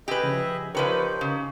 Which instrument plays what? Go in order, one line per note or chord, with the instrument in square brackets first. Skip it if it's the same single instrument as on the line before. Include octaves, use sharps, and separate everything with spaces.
[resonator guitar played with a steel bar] G4 B4 [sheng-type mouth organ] G#4 D#5 E5
[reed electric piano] C#3 F3 G#5
[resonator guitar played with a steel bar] F3 B4 C#5 [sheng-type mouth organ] C4 D#4 G4 [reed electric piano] A#4 A5
[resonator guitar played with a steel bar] C#3